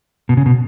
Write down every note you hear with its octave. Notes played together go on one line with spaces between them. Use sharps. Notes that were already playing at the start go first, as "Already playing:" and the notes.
B2
C#3
B2